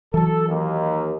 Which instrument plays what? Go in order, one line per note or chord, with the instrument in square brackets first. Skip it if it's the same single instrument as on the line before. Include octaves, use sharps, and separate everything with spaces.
[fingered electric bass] E3 F#3 [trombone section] A4
[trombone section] D#2